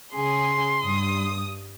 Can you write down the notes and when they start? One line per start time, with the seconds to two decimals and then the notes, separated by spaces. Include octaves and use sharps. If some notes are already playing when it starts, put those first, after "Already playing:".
0.15 C#3 G#4 C6
0.83 G2 D#6